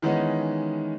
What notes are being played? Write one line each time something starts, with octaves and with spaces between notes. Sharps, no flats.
D#3 E3 G#3 B3 C#4 D#4